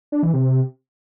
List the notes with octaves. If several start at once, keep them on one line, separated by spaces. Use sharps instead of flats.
D4
E3
C3